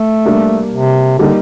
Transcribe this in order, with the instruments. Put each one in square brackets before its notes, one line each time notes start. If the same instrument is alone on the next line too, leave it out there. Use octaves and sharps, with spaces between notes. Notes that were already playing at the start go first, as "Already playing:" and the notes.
Already playing: [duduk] A3
[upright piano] G3 A#3 D4
[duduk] C3
[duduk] D3 [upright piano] G3 A#3 D#4 G4